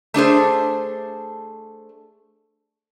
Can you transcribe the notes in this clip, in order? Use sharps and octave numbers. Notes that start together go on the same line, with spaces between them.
A3 D4 G#4 C5